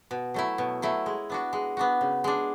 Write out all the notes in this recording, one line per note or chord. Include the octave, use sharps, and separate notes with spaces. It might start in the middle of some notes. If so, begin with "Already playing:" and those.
B2
F#3 A3 E4
B2
F#3 A3 E4
G#3
B3 D4 F#4
G#3
B3 D4 F#4
C#3
G#3 D4